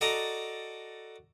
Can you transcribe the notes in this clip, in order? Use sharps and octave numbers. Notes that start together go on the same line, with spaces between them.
F#4 A4 D5 D#5 A#5